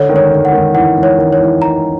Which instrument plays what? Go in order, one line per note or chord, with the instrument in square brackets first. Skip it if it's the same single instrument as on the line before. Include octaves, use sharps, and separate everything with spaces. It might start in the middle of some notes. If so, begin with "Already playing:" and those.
Already playing: [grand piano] D3 [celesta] C#5
[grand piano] D#3
[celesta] C#5
[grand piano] D3
[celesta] F#5
[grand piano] D#3
[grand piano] E3 [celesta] F#5
[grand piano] E3
[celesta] C#5
[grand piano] D#3
[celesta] C#5
[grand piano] E3
[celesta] A#5